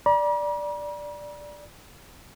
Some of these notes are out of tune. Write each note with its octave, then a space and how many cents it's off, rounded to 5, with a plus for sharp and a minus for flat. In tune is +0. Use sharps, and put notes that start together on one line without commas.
D5 +0 A#5 +45